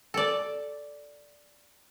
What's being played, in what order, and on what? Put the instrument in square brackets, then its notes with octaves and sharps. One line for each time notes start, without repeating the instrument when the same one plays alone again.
[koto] A4 D5